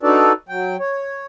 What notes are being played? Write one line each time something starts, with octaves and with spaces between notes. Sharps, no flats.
D4 D#4 F#4 A4 B4 D5
F#3 G5
C#5